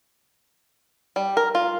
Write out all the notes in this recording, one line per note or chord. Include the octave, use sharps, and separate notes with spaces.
G3
A#4
F4